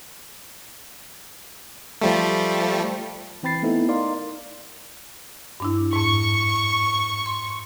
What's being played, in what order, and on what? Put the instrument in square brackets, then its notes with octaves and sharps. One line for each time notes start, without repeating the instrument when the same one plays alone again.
[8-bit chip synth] F3 G3 A3
[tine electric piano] E3 C4 G5 B5 A6 C7
A3 B3 D#4 E4 A4
D#4 A#4 D5 F5 C6
[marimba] G2 D4 E4
[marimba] F2 G#2 [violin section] C#6
[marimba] C6